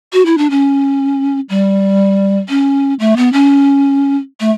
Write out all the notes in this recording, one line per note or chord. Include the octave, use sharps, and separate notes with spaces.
F#4
E4
D4
C#4
G3
C#4
A3
B3
C#4
A3